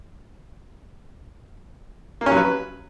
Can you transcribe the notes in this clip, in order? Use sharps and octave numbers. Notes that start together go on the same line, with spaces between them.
A#3
C#4
F#3
B4